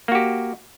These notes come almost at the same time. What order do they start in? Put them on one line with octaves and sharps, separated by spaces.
A#3 F#4 G4